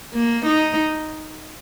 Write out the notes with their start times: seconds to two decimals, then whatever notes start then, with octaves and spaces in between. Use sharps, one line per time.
0.15 A#3
0.46 D#4